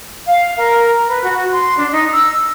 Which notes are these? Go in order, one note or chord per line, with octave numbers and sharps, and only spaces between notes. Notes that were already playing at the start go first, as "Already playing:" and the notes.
F5
A#4
B4
F#4
C6
D4
D#4
E6